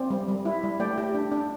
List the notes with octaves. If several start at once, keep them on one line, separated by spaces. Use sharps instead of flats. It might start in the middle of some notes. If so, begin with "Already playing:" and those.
Already playing: C4 D5
G3
G3
E4
G3
A3 D5 G5
G4
D4
D4